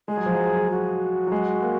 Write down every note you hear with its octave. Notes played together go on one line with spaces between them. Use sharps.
G#3 G#4
F#3
F3
F#3
F#4
F#3
G#3
A#3